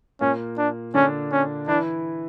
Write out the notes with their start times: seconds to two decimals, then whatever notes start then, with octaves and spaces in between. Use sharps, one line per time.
0.21 A#2 A#3 C#4
0.58 D4
0.94 D3 C#4 D4
1.31 C#4
1.68 E3 D4 E4